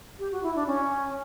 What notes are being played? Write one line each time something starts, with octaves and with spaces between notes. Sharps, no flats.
G4
F#4
E4
D4
C#4